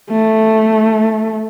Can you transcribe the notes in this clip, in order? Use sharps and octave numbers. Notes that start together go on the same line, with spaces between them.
A3